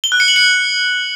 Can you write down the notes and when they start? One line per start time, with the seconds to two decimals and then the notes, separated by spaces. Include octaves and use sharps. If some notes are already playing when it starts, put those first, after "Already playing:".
0.04 G7
0.12 F#6
0.20 C#7
0.28 F#7
0.36 C#7